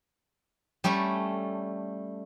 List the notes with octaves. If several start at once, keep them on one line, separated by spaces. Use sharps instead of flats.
G3 A3 C#4 A4